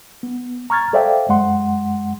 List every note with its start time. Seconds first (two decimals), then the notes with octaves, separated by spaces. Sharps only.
0.23 B3
0.70 A#5 C#6 F6 G#6 A6
0.93 A4 C5 D5 E5 F5 G5
1.29 F#2 G#3 F#5 C6